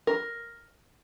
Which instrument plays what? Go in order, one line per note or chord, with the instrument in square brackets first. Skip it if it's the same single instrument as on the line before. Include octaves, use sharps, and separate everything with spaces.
[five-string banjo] A#4